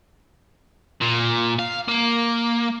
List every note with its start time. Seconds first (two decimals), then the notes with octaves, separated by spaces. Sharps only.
1.02 A#2
1.59 F5
1.88 A#3